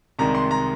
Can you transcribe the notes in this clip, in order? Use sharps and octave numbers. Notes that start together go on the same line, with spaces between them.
C2 C3 D#3 G#3 A#5
C6
A#5